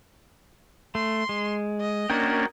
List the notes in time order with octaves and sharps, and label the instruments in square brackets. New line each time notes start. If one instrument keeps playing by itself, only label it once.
[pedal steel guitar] A3 [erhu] C6
[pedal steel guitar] G#3
[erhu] D#5
[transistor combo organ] A#3 C#4 D4 [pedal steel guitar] F#4 A#4 G5